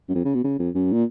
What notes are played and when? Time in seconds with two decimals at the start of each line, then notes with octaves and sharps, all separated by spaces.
0.09 F#2
0.15 F2
0.25 C#3
0.35 B2
0.44 C#3
0.59 F2
0.75 F#2
0.92 A#2